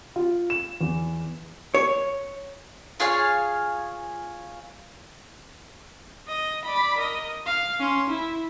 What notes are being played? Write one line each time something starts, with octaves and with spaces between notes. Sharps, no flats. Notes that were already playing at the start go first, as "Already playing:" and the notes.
F4
E7
E2
C#5
F4 G#4 C#5 F5
D#5
D5 B5
A#4 D#5
F5
C#4 C6
E4